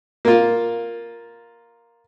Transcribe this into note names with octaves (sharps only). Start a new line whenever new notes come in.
A#3 F4